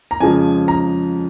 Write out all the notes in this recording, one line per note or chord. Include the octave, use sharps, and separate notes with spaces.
A#5
F2 C#3 F3 G#3 G#5
A#5